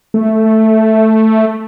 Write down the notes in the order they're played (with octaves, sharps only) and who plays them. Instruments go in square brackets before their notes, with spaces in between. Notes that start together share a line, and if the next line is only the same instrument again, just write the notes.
[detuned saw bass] A3